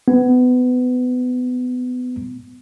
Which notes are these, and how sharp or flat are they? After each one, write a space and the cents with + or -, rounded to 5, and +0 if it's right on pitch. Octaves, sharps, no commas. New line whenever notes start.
B3 +20